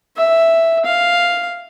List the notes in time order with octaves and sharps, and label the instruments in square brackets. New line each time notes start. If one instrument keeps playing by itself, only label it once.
[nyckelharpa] E5
F5